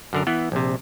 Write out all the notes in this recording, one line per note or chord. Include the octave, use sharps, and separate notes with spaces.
F#2 D3 A#4
E3 B3
A#1 C3